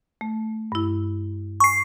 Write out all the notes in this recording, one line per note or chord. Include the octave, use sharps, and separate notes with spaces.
A3
G2 E4
G#5 C#6 C7